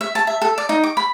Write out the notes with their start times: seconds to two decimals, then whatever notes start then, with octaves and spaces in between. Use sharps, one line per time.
0.01 E5
0.15 A5
0.27 E5
0.42 A4
0.58 D5
0.69 D#4
0.83 D6
0.97 B5